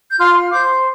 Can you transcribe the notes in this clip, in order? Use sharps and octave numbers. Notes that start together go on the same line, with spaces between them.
G6
F4 C6 F6
C5 D6 G6